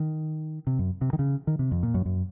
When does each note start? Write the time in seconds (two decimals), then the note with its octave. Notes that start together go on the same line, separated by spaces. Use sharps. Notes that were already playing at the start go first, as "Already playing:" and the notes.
Already playing: D#3
0.67 C3
0.79 F#2
1.01 C3
1.13 D#3
1.19 C#3
1.47 D#3
1.59 C3
1.71 F2
1.83 A#2
1.94 F#2
2.05 F#2